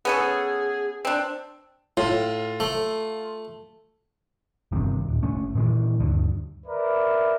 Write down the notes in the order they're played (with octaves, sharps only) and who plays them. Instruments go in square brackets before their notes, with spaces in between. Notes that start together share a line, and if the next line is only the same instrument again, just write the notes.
[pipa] B3 C#4 A4 [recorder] G#4
[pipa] C4 D4
[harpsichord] A2 [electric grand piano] F4
[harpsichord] A3
[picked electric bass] G1 G2 C3 D#3
D1
F#1 A3 C#4
A#2 D#3 E3
D2 G2 D3 D#3
[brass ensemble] A#4 B4 D5 E5